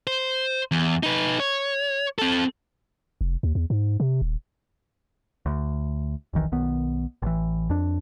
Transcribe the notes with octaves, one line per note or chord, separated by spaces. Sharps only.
C5
E2
D#4 B4
C#5
C4 A4
F1
D#2
E2
G#2
C3
D#1
D2
E1 B1 D#3 E3
B1 D#3 B3
A1 E3
F2 D4